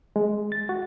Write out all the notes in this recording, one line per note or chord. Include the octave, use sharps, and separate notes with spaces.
G#3
A6
F#4